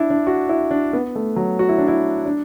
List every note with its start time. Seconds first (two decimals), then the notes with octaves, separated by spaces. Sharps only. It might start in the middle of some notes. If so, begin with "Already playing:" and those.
Already playing: D4 E4
0.10 D4
0.27 F#4
0.49 E4
0.71 D4
0.93 B3
1.15 A3
1.36 F#3
1.59 F#4
1.69 E4
1.78 D4
1.88 E4
2.26 D4